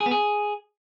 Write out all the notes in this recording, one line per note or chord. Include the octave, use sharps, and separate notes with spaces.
G#4
B3
G#4